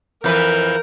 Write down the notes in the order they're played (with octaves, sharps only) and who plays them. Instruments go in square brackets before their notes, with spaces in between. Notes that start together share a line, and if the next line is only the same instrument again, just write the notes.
[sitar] F2 E3 B4 [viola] A#4 [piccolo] G6